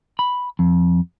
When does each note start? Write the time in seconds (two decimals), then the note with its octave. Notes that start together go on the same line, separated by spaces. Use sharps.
0.19 B5
0.59 F2